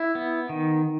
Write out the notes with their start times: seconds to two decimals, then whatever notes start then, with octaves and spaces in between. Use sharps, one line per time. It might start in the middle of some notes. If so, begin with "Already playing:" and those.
Already playing: E4
0.15 B3
0.49 D#3